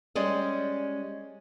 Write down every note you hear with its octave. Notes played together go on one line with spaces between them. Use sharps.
G3 G#3 C#4 D5 D#5